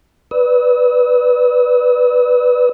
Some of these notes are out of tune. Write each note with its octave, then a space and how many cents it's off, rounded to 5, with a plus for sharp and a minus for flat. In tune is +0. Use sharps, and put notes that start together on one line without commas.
B4 +0 D5 +0 E6 -45